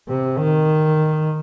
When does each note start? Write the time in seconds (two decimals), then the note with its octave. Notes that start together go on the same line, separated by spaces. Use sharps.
0.09 C3
0.37 D#3